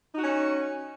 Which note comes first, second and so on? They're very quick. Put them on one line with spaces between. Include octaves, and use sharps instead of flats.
D#4 F#4 C#4